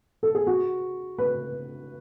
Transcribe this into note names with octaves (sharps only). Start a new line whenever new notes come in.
A4
G#4
F#4
B4